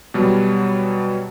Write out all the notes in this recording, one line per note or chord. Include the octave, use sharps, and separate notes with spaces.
B2 F#3 G3